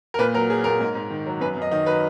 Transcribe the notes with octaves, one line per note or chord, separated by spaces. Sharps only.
A#4
A#2 B4
F#3 A#4
F#3 G#4
A#2 A#4
G#2
G#2
D#3
F#3
F#2 B4
F#2 D#5
D#3 D#5
F#3 B4